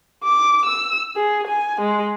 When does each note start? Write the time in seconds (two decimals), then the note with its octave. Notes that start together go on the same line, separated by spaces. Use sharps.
0.24 D6
0.66 E6
1.16 G#4
1.47 G#5
1.81 G#3